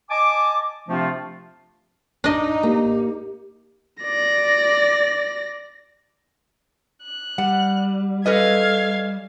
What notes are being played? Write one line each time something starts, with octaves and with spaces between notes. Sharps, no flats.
D#5 G#5 A5 D6
C3 F3 A3 C4 D4 F4
D4 D#4 D#5
A#3 G4
D5 A#6
F#6
G3 F#5
C#4 A4 B4 D#5 F5 G#6